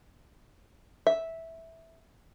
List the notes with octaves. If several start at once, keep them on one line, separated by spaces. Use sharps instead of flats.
E5